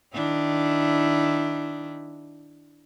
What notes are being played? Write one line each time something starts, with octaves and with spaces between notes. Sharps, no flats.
D#3 D4 E4